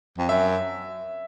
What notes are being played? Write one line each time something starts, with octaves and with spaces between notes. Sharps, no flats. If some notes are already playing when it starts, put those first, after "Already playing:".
F2
F#2 E5